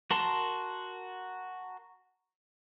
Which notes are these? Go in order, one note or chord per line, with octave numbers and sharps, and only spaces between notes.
F#4 A#4 A5 C6